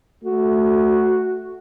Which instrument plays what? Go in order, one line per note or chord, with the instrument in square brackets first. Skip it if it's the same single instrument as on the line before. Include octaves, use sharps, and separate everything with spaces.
[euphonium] A3 [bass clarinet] F#4